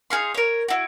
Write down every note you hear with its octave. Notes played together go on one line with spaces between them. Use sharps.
D#4 G#4 F5 C6
A#4 C#5
E4 F#4